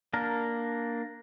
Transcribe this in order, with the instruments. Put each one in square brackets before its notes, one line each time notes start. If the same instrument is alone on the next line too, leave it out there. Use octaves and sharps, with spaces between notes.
[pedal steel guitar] A#3 D4 A#4